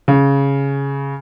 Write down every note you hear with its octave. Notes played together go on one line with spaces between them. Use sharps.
C#3